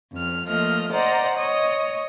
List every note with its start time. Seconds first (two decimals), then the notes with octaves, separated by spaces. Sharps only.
0.13 F2 F6
0.47 F3 A3 A#3 D#5 F6
0.92 C5 D5 D#5 F#5 A#5
1.38 C#5 D#5 D#6